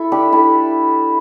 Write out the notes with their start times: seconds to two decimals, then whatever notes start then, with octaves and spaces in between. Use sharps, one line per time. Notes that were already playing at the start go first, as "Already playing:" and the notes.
Already playing: E4 A4
0.12 D4 G4
0.33 E4 A4